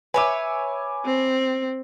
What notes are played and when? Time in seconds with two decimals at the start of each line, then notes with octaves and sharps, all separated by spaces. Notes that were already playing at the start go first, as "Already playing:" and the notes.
0.14 B4 C#5 E5 G#5 D6
1.06 C4